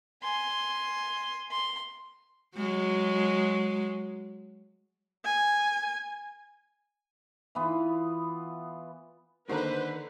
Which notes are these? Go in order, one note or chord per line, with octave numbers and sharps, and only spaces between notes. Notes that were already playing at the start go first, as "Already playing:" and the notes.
G#5 C6
C6
F#3 G#3
G#5
E3 B3 F4
D3 D#3 A#3 D#4 B4 C5 A#5